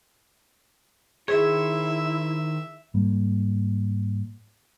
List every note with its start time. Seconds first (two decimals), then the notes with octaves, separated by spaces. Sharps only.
1.28 D#3 E4 G#4 C5 C#5 E5
2.94 G#2 G3 A#3